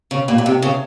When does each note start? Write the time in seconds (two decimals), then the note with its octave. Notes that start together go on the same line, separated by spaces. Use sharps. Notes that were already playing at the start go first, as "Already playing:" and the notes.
0.11 C#3
0.28 A#2
0.38 A#2
0.46 C3
0.62 C#3